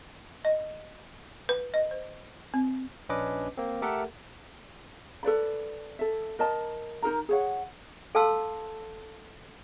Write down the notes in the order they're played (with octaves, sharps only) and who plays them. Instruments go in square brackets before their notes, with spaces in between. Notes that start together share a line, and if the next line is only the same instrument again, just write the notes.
[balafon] D#5
B4
D#5
C5
C4
[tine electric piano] A#1 C#4 D4 B4 D#5 D6
A#3 C4
A3 G4 A4 A#4 E5 F#5
[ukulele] A4 B4 D5 B5
A4 E5
A#4 D#5 A5
D#4 G#4 A#4 A#5
G#4 C#5 F#5
[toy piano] A4 F5 A5 C6 E6